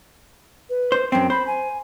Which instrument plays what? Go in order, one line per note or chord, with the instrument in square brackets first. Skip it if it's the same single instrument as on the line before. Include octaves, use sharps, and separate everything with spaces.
[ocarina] B4
[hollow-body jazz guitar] C5
[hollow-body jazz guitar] F#2 C4 [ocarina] G5
[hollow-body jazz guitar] C5 [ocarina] B5
[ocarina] G#5